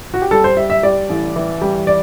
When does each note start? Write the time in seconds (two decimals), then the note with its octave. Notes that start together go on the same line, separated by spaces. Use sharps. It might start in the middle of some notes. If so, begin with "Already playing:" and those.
0.14 F#4
0.22 G4
0.31 G3 A4
0.44 C5
0.57 G3 E5
0.70 E5
0.83 G3 D5
1.09 A1
1.36 E3
1.62 G3
1.87 D5